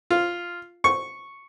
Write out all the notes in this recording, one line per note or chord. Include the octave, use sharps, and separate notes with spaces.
F4
C#6